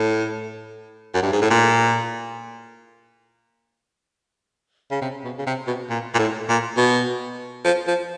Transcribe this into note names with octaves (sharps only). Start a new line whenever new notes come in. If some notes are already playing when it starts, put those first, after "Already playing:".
Already playing: A2
F#2
G2
G#2
A2
A#2
C#3
C3
B2
C#3
C3
B2
A#2
A#2
A2
A#2
B2
F3
F3